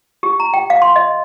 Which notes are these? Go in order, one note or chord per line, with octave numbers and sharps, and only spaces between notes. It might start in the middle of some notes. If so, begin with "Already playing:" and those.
G4
A#5
G5
F5
C6
D#5